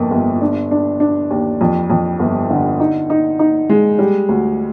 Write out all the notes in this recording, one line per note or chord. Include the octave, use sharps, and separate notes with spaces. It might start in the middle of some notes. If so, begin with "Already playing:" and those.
Already playing: G1 F2 A#3
G1
D4
D4
D4
D#2
F2
F2
G1
D3
D#4
D#4
D#4
G#3
G3
D2